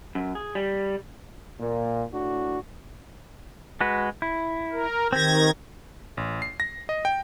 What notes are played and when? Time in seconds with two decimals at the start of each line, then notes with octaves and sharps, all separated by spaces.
0.15 F#2
0.35 G#4
0.55 G3
1.60 A#2
2.12 A2 D4 F#4
3.81 G#3 F#4 B4
4.22 E4
4.72 A#4
5.13 D#3 C4 G4 G#6 A#6
6.17 A1
6.42 C7
6.60 A#6
6.89 D#5
7.05 G5